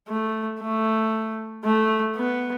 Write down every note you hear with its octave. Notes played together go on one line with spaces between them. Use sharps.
A3
A3
A3
B3